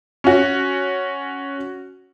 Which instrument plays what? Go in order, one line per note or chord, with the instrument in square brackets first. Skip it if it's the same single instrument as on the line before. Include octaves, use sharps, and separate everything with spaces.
[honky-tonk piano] C#4 F#4